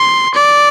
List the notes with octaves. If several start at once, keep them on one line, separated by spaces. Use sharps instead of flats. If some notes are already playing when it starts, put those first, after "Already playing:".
Already playing: C6
D5